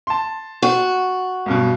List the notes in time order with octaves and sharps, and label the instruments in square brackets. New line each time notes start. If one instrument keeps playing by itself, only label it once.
[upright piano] A5 C6
[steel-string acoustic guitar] F#4
[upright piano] B1 G2 B2